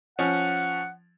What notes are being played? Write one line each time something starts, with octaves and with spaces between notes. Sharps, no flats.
F3 C#4 F#5